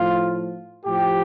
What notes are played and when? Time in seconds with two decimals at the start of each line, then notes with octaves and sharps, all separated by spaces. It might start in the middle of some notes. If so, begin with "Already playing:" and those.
Already playing: A2 F3 F4
0.85 A2 F3 G4